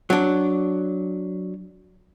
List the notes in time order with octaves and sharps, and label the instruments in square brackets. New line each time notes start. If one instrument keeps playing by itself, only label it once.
[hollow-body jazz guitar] F#3 D4